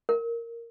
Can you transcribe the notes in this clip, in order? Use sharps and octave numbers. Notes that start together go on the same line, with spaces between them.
A#4